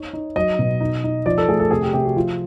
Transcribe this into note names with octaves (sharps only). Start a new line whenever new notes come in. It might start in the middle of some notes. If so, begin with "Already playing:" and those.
Already playing: D#4 C#5
D#4
F#3 D#5
B2
D#4
D#4
F3 D5
A4
A3 G#4
A4
C3 G#4
G4
C3 G4
F#4
F3 F4